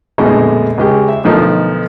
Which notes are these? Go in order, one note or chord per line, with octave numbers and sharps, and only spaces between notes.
A#1 F2 B2 D3 G#3 A3
C#2 G#3 G4
E5
B1 D3 F3 A3 D#4 A#4